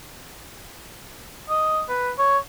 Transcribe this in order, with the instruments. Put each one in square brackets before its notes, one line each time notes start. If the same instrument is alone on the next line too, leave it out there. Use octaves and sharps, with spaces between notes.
[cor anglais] D#5
B4
C#5